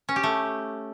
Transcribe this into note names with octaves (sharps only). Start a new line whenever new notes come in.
C#4
G4
A3